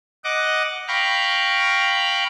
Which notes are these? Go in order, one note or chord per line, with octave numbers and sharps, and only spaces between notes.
D#5 F#5 D6
F5 G5 A#5 B5 C#6